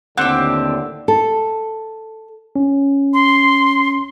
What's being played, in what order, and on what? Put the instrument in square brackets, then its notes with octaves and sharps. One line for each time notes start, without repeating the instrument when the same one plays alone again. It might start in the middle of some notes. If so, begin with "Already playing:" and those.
[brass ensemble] D#2 A2 D3 [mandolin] C4 G4 [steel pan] F#5
[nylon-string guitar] A4
[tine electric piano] C#4
[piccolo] C6